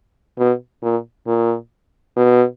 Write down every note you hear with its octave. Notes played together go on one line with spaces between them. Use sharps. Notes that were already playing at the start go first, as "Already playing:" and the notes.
B2
A#2
A#2
B2